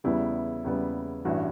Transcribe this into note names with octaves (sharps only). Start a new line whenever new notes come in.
E2 C#3 G3 B3 E4
E2 C#3 G3 B3
A1 G2 E3 F#4